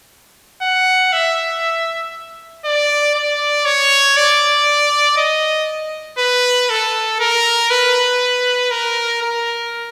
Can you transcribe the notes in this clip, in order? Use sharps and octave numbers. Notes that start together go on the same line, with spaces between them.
F#5
E5
D5
D5
C#5
D5
D#5
B4
A4
A#4
B4
A#4
A#4